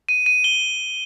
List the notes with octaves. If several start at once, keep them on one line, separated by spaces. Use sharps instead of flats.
D#7
D#7
G7